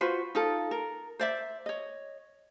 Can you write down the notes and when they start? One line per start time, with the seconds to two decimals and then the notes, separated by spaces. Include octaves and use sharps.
0.01 F4 F#4 B4 C5
0.35 D#4 F4 A4
0.71 A#4
1.19 C5 D5 E5
1.66 C#5 D#5